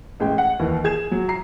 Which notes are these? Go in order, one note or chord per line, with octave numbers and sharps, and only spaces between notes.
A1 G#3 G5
F#5
D#2 E3
G#4 G#6 E7
F#3
A#5 C7